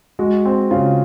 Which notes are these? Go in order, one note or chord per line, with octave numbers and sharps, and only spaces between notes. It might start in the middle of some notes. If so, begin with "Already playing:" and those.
G#3 F#4
C4
C#3 F4